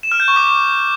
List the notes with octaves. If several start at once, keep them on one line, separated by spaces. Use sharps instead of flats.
E7
F6
G6
C#6
D6